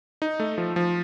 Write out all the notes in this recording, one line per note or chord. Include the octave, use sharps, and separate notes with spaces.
D#4
A3
F3
F3